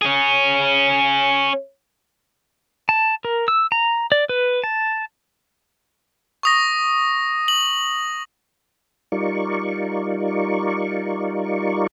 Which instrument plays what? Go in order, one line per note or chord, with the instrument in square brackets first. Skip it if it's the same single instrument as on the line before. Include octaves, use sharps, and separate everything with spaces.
[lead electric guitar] C#4 G#4
[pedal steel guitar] A5
A#4
E6
A#5
D5
B4
A5
[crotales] C#6 D#6 A#6
F#7
[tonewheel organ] G3 D#4 F4 A#4 D5 C#6